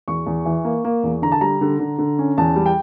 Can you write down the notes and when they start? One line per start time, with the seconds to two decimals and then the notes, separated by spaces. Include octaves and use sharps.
0.08 E2 C#6
0.26 E2
0.45 E3
0.65 A#3
0.84 A#3
1.03 E2
1.22 D3 A#5
1.32 A5
1.41 G3 A#5
1.61 D3
1.79 D3
1.98 D3
2.19 C#4
2.38 E2 A5
2.56 G3
2.66 G5